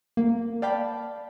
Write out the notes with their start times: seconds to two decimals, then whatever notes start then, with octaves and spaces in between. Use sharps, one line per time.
0.17 A#3
0.62 D5 F5 G5 A5 B5